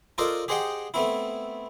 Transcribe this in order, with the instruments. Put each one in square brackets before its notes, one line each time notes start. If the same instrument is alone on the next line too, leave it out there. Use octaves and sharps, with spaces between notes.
[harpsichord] F4 A4 A#4 C5 D5 D#5
G4 G#4 C5 D#5 F#5 G5
A3 B3 C4 E4